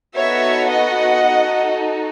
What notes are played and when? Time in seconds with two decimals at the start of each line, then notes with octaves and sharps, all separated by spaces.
0.16 B3 D#4 F#4 A4 C#5 E5
0.71 D#5 F#5
1.25 D#4 F#4 A4